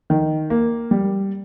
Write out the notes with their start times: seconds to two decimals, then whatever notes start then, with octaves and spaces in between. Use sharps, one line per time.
0.10 D#3
0.50 A#3
0.91 G3